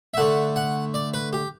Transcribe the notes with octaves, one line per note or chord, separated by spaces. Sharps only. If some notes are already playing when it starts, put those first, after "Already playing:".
E5
D3 A3 F#5
F#5
D5
B4
G4